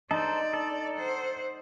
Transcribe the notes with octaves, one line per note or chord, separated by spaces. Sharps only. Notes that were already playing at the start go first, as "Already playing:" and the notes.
D#4 A4 C5 D5
A4
C5 F#5